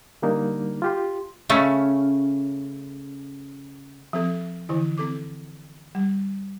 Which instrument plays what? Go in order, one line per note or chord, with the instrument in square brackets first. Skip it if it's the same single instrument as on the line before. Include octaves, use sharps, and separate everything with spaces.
[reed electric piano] D3 G3 A#3 D4 D#4
F4 G4 C6
[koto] C#3 A3 C#4
[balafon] F3 C4 A4
D3 E3 E4
C4 A4 D6
G3